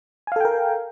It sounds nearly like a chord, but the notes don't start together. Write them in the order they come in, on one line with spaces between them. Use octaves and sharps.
G#5 F5 A4 G5 A#4